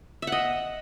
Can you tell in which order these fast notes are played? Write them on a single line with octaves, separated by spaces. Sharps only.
E5 F#5 D#5